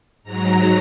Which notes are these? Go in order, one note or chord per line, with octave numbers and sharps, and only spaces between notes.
G#2 F#3 A#5